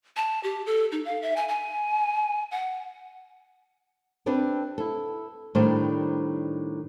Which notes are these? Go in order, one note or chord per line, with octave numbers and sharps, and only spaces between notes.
A5
G4
A4
D#4
F5
E5
G#5
G#5
F#5
B3 C4 D4 G4 B4
E4 A4
A2 D#3 G3 D4 C5